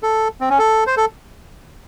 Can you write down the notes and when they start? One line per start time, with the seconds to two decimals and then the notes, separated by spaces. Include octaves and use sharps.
0.03 A4
0.41 C4
0.50 C#4
0.59 A4
0.87 C5
0.97 A4